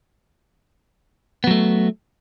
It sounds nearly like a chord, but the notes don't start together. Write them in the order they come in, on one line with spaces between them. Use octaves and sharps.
B3 F#3 A3